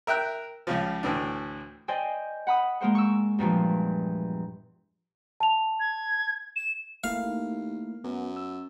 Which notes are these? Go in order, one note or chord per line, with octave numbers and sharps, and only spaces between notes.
A#4 E5 G5 F#6
C#2 C#3 F3
D2 A2 E3 D4
C5 D5 D#5 G5 G#5
F#5 B5 D#6
G#3 A#3 A#4 C5 F#5
C#6 E6
E2 G2 A#2 F3
A5 F7
G#6
E7
A3 A#3 E4 F5
D#2
F#2 B3
E6